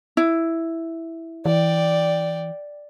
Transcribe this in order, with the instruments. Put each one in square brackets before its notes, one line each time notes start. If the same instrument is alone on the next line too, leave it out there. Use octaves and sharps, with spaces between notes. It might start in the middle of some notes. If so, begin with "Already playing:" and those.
[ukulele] E4
[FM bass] E3 [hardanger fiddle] D5 G5